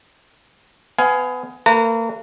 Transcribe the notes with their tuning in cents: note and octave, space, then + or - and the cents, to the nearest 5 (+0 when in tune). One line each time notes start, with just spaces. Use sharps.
B3 +25 F5 +0 G#5 +10
A#3 -40 B4 -15 A#5 -35